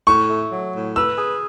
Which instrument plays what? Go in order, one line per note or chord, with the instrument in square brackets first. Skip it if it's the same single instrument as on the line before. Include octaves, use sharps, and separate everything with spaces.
[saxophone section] A2 [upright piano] C#6
[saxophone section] A3
F#3
A2
[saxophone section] B4 [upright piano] E6
[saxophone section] G#4